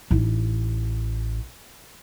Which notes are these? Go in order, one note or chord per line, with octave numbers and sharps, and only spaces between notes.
A1 D#4